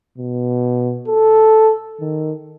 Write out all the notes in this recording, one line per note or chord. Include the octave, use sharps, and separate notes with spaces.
B2
A4
D#3